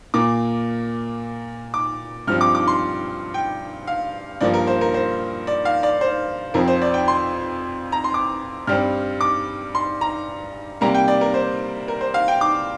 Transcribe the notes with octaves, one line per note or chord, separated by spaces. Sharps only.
A#2 A#3 D6
D6
G2 F3 C4 F6
D6
D6
C6
G5
F5
G2 F3 A#3 D5
A#4
C5
A#4
C5
D5
F5
D5
C5
F2 F3 C4 A#4
C5
D5
G5
C6
A#5
C6
D6
G2 G3 C4 F6
D6
C6
A#5
C3 G3 A#3 A#5
G5
D5
A#4
C5
A#4
C5
F5
G5
D6